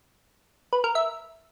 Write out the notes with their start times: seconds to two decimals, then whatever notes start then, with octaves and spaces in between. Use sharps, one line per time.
0.73 B4
0.84 A#4
0.95 E5